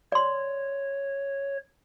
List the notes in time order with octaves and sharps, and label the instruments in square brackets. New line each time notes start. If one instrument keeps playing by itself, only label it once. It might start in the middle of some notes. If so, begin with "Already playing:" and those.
[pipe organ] C#5 [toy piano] D5 C6